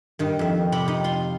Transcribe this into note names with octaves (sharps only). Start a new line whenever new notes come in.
G2 D#3
F2 E5
C3 G4 B5
D#4
F4 C6